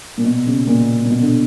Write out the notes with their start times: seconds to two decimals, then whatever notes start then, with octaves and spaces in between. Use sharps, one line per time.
0.18 A#2
0.24 B2
0.46 C#3
0.67 A#2
1.04 A#2
1.10 B2
1.21 D3